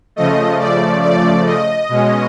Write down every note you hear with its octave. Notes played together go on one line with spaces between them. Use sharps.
C#3 F3 A3 D#5
D5
D5
D#5
B2 G#3 C#4